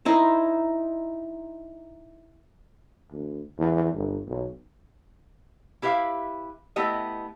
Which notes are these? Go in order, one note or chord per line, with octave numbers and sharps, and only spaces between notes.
D#4 E4 C5
D2
E2
G1
B1
E4 G4 B4 E5 F5
A3 B3 E4 G4 D#5